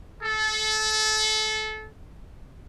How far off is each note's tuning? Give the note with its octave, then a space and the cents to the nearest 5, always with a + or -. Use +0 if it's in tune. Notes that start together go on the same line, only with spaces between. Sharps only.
A4 -25